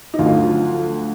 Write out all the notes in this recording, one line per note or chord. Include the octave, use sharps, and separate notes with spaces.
D#4
D2 D3 F3 F#3 F4